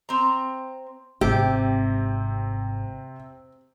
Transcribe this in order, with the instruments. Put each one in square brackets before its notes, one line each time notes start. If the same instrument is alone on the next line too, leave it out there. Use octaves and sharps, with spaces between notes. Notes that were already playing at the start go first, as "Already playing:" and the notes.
[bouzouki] C4 A#5
[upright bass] G#1 G#2 [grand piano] C3 [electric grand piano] C4 [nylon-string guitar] G4